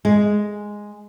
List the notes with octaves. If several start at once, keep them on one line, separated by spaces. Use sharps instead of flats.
G#3